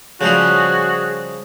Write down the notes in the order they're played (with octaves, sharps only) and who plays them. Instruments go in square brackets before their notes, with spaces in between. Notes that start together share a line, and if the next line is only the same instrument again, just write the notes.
[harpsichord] C#3 F3 G3 [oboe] F#4 [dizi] G#4